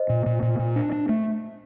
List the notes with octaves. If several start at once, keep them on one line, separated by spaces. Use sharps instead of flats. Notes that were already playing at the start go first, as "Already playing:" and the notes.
Already playing: C5 D#5
A#2
A#2
A#2
A#2
D4
D4
A3